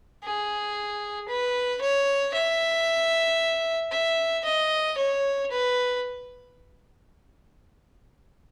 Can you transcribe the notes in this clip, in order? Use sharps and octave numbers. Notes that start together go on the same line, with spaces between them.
G#4
B4
C#5
E5
E5
D#5
C#5
B4